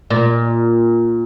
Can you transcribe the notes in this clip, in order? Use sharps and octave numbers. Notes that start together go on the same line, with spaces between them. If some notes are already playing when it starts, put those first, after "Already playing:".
A#2